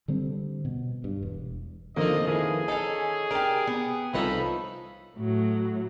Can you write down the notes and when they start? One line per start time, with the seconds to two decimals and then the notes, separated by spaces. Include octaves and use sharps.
0.08 D3 G3 C4
0.65 B2
1.04 G2
1.23 E1
1.97 F2 D3 D#3 F3 A#3 D#5
2.27 D#3 E4 G#4 B4
2.68 C#4 D#4 A4 A5
3.31 D4 G4 A#4
3.67 B3
4.14 C2 F3 D#4 A4 B4 C#5 B5
5.16 A2 F#3